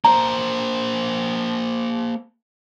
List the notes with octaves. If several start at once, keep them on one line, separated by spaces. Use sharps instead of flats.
A#3 C5 A#5